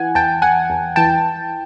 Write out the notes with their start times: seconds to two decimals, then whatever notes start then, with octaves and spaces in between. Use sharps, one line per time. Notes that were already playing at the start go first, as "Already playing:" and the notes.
Already playing: E3 F#5 G#5
0.15 E2 G5 A5
0.42 E2 F#5 G#5
0.70 E2
0.96 E3 G5 A5